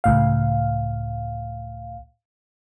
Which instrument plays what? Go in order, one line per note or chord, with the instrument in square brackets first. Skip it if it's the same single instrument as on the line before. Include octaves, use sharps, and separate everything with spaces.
[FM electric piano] C#2 A2 F5